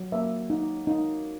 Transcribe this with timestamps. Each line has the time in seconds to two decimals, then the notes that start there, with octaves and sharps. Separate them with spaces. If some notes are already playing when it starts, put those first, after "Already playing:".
Already playing: F#3
0.12 A#3 E5
0.50 D#4
0.87 D#4